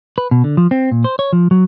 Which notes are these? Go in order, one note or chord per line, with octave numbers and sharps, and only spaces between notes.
B4
B2
D3
F3
C4
A#2
C5
C#5
F3
F#3